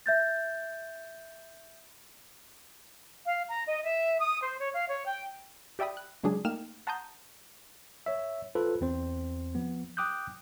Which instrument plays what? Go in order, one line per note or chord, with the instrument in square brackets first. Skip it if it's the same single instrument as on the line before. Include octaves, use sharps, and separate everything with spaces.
[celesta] E5 G6 A6
[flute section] F5
A#5
D#5
E5
D#6
C5
C#5
F5
C#5
G5
[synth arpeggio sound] G4 D5 E5 G5 B5 D#6
F#6
C#3 F#3 G#3 D4 G#4
A3 A#3 D#4 G5 F6 E7
F#5 A5 A#5 C6 D#6 G6
[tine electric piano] C#5 E5
F4 A4 B4 C5
E2 C4 C5
F3 B3
G5 D6 D#6 F#6 G6